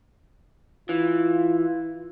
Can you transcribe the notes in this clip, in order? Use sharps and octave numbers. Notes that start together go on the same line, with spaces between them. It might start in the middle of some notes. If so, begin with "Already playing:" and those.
E3 F4